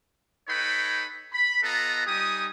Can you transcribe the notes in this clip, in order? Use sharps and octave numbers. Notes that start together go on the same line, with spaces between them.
D#4 A4 B4 C#5 G5 B5
B5
B3 F4 A4 B4 D#5 A#5
G3 D#4 G4 G#5 D#6